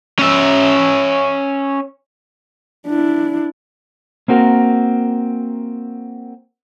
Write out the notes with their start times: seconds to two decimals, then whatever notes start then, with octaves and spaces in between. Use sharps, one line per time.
0.19 C#4 E5
2.87 D4 E4
4.28 A#3 C4 F#4 A#4